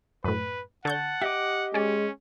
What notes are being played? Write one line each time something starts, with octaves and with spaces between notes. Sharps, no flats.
F#2 A2 B4
D3 F#5 A5 C#6 G6
G4 D#5 E5 D6
G#3 C#4 G#4 D5